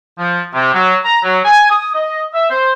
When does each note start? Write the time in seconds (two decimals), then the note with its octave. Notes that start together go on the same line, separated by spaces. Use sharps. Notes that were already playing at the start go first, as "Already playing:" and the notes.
0.19 F3
0.54 C3
0.73 F#3
1.04 A#5
1.24 F#3
1.45 G#5
1.70 D#6
1.94 D#5
2.34 E5
2.50 C5